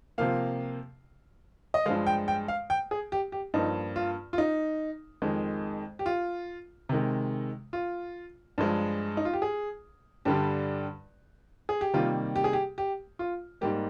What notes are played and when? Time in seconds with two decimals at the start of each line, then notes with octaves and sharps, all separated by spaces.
0.18 C3 F3 A#3 F5
1.74 D#5
1.86 G2 F3 G#3 F5
2.07 G5
2.28 G5
2.48 F5
2.70 G5
2.91 G#4
3.12 G4
3.32 G4
3.54 G2 F3 A#3 D#4
3.96 F4
4.33 F4
4.38 D#4
5.22 F2 D#3 G#3
5.99 G4
6.06 F4
6.89 C3 D#3 G#3
7.73 F4
8.58 G2 F3 G#3
9.17 D#4
9.25 F4
9.33 G4
9.42 G#4
10.25 G2 D3 G3 G4
11.69 G#4
11.81 G4
11.93 C3 D#3 G3 A#3 F4
12.36 G4
12.44 G#4
12.53 G4
12.78 G4
13.19 F4
13.61 G#2 G3 A#3 G4